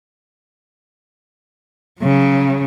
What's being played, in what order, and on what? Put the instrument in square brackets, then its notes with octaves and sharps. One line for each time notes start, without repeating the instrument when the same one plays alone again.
[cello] C#3 F#3